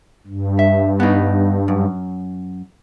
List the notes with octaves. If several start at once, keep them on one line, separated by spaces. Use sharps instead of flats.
G2
E5
B3 D#4
F#2